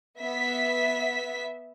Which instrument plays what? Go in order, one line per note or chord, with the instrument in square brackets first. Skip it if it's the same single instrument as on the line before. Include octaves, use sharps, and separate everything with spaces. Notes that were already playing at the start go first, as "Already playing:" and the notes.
[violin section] B3 E5 B6